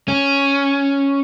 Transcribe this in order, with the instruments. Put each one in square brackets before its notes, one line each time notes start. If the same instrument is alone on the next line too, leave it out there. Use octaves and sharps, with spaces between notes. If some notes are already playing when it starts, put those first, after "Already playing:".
[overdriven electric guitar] C#4